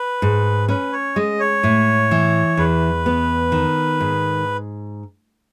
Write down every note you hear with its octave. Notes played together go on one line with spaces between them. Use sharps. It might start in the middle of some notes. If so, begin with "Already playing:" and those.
Already playing: B4
G#2
C#4 B4
C#5
G#3 D#5
C#5
A2
E3
E2 B4
B3
D#3
G#2